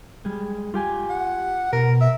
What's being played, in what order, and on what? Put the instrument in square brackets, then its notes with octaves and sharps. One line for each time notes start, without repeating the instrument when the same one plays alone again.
[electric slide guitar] G3 G#3
F4 G4 G#5
[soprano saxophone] F#5
[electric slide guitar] B2 [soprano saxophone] A#4
[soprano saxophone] E5